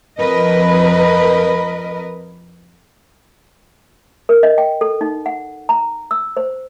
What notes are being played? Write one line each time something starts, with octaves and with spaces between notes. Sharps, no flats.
F2 A#4 B4 D#5
A#4
D#5
G5
A4
D#4
F#5
A#5
E6
C5